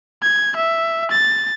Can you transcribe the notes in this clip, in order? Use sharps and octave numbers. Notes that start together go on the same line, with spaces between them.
G#6
E5
A6